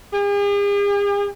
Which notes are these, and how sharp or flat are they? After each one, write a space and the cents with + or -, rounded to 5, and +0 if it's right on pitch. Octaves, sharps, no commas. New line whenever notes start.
G#4 -45